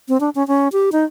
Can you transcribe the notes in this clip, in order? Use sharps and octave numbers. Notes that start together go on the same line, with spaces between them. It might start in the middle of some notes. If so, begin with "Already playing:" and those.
C4
D4
C#4
C#4
G4
D#4